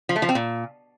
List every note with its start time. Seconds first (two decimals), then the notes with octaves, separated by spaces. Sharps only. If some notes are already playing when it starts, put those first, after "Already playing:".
0.09 F3
0.16 A3
0.22 F3
0.29 C4
0.35 A#2